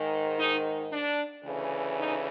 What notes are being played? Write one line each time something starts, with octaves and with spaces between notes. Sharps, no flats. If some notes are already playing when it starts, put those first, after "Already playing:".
Already playing: G#2 D#3
D#4
D4
D2 C#3 E3
D#4